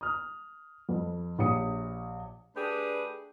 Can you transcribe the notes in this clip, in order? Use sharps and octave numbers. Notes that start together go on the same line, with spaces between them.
D#6 F6
F2
A#1 G4 C#5 D#6 C#7
A3 D4 G4 G#4 B4